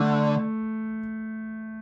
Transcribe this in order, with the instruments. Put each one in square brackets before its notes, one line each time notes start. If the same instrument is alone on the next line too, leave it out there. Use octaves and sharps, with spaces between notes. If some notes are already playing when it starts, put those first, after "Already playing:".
Already playing: [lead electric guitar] D3 [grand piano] A3